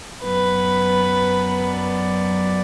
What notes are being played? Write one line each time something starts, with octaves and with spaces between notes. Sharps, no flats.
F#2 F#3 B3 B4
D5